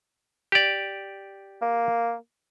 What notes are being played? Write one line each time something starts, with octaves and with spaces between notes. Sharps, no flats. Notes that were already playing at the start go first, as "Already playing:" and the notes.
G4 D5
A#3